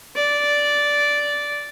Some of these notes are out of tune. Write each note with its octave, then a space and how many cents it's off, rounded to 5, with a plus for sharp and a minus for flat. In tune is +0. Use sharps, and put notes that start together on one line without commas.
D5 -10